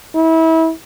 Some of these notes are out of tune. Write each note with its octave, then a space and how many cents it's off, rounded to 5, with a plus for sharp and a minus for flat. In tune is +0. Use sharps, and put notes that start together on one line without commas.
E4 -30